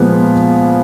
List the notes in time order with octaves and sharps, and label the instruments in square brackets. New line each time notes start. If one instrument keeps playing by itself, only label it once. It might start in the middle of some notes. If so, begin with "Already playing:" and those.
Already playing: [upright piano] A#2 F3 G#3 B3